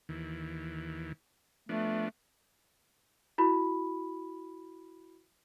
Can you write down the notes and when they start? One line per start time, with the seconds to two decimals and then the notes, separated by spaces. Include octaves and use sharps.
0.09 D#2 E3
1.69 F3 A3 B3 D4
3.38 E4 F#4 B5